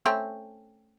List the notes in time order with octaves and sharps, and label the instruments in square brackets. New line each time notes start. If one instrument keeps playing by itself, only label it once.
[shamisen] A3 C4 C#4